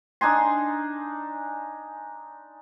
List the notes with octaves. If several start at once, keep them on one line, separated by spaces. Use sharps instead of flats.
D4 D#4 G#5 C6